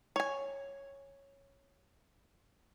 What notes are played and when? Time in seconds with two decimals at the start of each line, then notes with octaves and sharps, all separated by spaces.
0.16 C#5 G#5